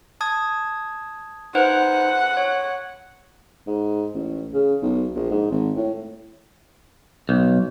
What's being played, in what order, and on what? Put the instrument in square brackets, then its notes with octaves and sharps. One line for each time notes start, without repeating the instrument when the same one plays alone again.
[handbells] A5 D#6 G#6
[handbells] D#4 B4 C5 [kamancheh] F#5
[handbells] C#5
[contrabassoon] G#2
A1
C#3
B1
A#1
G#2
G#1
A2
[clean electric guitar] B1